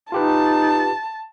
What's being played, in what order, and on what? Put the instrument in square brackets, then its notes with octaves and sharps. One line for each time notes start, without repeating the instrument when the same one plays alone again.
[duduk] D#4 [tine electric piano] F4 G4 B4 [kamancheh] A5